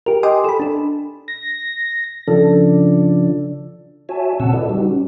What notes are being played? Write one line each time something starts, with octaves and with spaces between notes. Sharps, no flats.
G4 A#4
D#5 G5 G#5 C6 D6 D#6
A4 B5
D4 A4
A#6
C#3 F3 D4 A4
F#4 C#5 E5 G#5 A5
A#2 C#3 C4 F#5 A5 E6
E4 A4 B4 D5 D#5
G3 D#4 F#4 G4
C#4